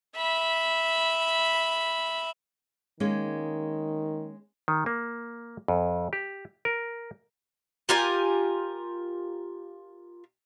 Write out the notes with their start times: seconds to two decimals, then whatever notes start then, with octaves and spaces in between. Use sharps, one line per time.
0.17 E5 B5
3.00 D#3 G#3 A#3 C#4
4.68 D#3
4.86 A#3
5.68 F2
6.13 G4
6.65 A#4
7.89 F4 G4 A#4 G#5